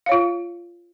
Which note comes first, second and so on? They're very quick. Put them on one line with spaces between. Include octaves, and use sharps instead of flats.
F5 C#5 F4